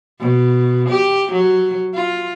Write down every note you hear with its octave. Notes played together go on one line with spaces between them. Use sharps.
B2
G4
F#3
F4